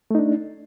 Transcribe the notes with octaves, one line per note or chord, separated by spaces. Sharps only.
A3 D4 D#4